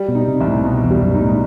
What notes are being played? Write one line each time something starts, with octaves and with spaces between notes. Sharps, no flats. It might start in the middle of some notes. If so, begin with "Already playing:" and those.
Already playing: G3
B2
D#4
C3
C2
A2
B2
E2
G3
F#2
D#4
A2